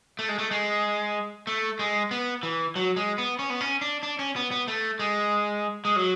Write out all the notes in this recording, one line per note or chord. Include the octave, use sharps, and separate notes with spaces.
A3
G#3
A3
G#3
A3
G#3
B3
E3
F#3
G#3
B3
C#4
B3
C#4
D4
D4
C#4
B3
B3
A3
G#3
G#3
F#3